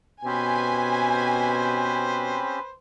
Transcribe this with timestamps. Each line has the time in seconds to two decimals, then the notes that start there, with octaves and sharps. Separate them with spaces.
0.25 B2 C4 C#4 G4 B4 C5 G#5